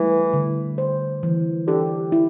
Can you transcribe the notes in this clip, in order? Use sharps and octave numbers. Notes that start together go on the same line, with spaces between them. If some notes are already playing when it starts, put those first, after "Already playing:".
Already playing: E3 G3 A3
D3
C5
E3
D3 G4
E4